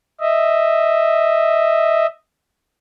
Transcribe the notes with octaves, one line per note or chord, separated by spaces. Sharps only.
D#5 E5